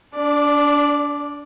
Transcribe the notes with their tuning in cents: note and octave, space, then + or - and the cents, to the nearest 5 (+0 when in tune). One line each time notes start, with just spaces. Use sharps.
D4 -25 D5 +0